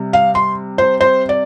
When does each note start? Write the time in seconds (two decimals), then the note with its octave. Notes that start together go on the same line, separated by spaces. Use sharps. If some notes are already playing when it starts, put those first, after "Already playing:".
Already playing: C3 G3
0.13 F5
0.35 C6
0.78 C5
1.01 C5
1.29 D5